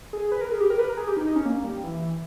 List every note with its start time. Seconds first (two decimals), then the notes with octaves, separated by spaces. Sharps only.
0.13 G#4
0.32 B4
0.41 A#4
0.51 G#4
0.60 G4
0.70 A#4
0.79 B4
0.89 A#4
0.97 G#4
1.07 G4
1.17 D#4
1.27 D#4
1.36 C#4
1.45 A#3
1.64 G3
1.84 E3